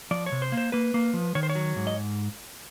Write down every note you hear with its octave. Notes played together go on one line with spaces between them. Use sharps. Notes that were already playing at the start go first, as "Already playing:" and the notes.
F3 D5
C#5
C3
C5
A#3
C5
A#3 B4
A#3
F3
D#3 C#5
C5
C#5
F#3
G#2
D#5